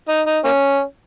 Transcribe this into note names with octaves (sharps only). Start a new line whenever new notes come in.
D#4
D#4
A#3 C#4